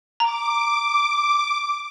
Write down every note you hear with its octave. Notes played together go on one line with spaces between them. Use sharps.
A#5 D6